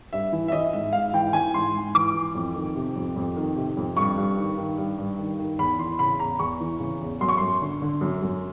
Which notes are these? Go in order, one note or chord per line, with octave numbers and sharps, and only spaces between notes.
G2 E5
E3
E5
E3 D#5
G#2 E5
G#2 F5
E3 G5
E3 G#5
G#2 C6
G#2
E3 D6
E3
F2
D#3
C3
F2
F2
D#3
C3
F2
G2 C#6
G2
D#3
D#3
G2
G2
D#3
D#3
E2 B5
E3 C6
C#3 B5
E2 A#5
E2 C#6
E3
C#3
E2
F#2 C6
C#6
F#2 C6
D3
D3
F#2
F#2